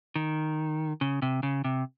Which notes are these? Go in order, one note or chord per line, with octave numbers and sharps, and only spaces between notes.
D#3
C#3
C3
C#3
C3